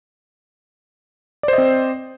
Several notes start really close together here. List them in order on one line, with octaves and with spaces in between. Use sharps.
D5 C5 D#5 C4